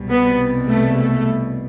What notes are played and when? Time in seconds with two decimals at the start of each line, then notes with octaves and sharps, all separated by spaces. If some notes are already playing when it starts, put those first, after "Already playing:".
Already playing: C2 B2 G3
0.09 B3
0.68 A3
0.98 A3